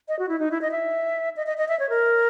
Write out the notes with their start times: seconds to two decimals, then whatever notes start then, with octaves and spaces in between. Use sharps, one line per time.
0.08 D#5
0.19 F#4
0.29 E4
0.39 D#4
0.51 E4
0.62 D#5
0.71 E5
1.37 D#5
1.47 D#5
1.57 D#5
1.68 E5
1.80 C#5
1.89 A#4